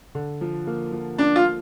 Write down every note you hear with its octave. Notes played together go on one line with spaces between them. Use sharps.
D3
F3
A#3
F3
A#3 D4
F4
F3